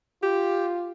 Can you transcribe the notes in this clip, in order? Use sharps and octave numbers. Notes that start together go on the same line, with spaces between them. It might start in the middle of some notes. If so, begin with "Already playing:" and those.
F4 G4